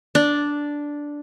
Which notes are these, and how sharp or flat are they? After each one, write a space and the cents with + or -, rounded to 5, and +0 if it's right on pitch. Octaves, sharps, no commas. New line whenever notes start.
D4 -5